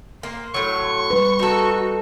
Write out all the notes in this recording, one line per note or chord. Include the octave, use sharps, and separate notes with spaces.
A#3 C6
A2 F#3 C#6
G3 B4
D#4 F#4 A4